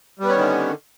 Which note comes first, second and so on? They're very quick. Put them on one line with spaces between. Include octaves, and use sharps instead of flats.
G3 B3 C#4 D#3 D3